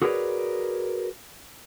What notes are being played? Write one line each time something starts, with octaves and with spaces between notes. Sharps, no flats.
F#4 G#4 A#4 B4 C#5 D5